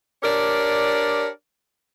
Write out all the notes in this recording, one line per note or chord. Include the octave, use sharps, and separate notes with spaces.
D4 G4 A#4 C#5 D5